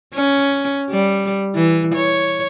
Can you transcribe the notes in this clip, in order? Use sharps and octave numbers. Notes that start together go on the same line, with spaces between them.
C#4
G3
E3
C#5